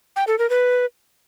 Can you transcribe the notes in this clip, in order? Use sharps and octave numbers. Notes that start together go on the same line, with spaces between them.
G5
A4
A#4
B4